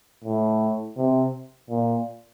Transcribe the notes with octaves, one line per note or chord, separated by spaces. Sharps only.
A2
C3
A#2